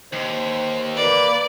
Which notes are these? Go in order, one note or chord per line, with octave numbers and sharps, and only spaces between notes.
D#2 C5
A#3 B4 D5